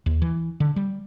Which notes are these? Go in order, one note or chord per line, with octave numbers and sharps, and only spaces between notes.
D#2
E3
D3
G3